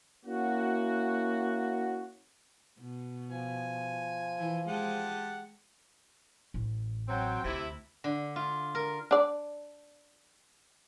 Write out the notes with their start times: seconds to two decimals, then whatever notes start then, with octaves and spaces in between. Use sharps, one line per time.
0.26 A#3 C#4 E4 F#4
2.80 B2
3.31 F3 G#5
4.38 E3
4.68 G#3 G4 F#5 A5
6.54 A1
7.08 F#3 C4 G5
7.44 D2 C3 E4
8.04 D3
8.36 F4
8.75 A#4
9.11 D4 D5